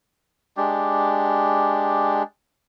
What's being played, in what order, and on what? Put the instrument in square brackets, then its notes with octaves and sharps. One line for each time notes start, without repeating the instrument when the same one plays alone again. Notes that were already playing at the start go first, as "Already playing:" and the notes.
[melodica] G#3 D4 G4